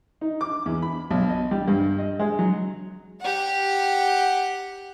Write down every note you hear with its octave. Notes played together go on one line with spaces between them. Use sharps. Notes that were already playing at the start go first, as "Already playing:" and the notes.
D#4
D6
E2
B5
B1
D#5
G3
G2
D#5
G#3
F#3
G4 F#5